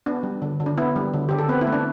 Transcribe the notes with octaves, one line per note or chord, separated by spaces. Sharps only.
B3 D4
G3
D3
D3
D4
B3 E4
G3
D3
D3 G4
A4
B3 C4 B4
E4
A3
D4